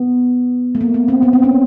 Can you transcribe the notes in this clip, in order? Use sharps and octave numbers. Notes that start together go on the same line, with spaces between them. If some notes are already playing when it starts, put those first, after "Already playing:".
Already playing: B3
A3
A#3
B3
C4
B3
C4
C#4